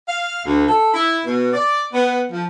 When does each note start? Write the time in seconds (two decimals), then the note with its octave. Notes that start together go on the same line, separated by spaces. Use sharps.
0.07 F5
0.44 D2
0.67 A4
0.94 E4
1.25 B2
1.53 D5
1.92 B3
2.31 F3